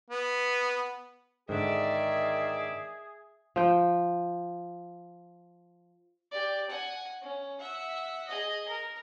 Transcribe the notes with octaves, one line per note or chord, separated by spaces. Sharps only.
B3
G#2 D3 D#3 G#4 D5 E5
F3 G5
G4 D5
F#5 G#5
C#4
E5 F#5
G#4 D#5
A#4